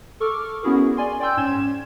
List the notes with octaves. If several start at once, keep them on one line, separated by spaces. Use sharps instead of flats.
A4 C#6 D6 F6
B3 C#4 E4 F#4 G#4 A#4
D5 G#5 C6
D5 G5 C6 E6 G6
G#2 C#4 G#6 E7